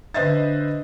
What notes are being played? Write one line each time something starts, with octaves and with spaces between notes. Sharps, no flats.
D3 B4 C5 D#5 E5 A6